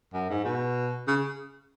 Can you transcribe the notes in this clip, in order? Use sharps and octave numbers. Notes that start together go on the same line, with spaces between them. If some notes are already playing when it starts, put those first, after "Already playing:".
F#2
G#2
B2
C#3